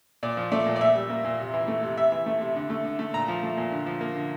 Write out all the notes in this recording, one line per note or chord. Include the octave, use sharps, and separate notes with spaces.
A#2 D5
F3
A3 D5
A#2
D5
A#2 E5
G3
A#3
A#2
C3
E3
A3
C3
C3 E5
E3
A3
C3
D3
A3
D3
A3
A#2 A#5
F3
A3
A#2
D3
F3
A#3
D3